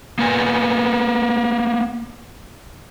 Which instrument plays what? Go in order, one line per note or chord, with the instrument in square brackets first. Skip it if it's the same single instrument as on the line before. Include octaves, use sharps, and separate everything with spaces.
[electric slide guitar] A#3 B3 G#5